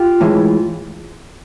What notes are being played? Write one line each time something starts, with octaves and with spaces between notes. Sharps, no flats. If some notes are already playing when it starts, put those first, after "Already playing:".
Already playing: F4 G4
A2 E3 G#3